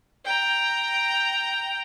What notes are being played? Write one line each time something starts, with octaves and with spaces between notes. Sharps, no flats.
G5 A#5